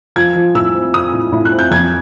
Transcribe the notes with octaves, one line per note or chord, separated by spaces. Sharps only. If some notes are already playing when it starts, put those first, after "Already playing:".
F3 G#6
F3
A2 E6
C4
C4 D#6
A2
A2
F#6
C4
G6
F2 G#6